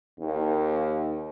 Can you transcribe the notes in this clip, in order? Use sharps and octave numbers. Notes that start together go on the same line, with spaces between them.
D#2